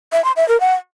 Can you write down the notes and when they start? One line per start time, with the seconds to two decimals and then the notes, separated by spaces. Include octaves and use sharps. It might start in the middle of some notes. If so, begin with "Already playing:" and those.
0.12 E5
0.24 C6
0.36 E5
0.48 A#4
0.60 F#5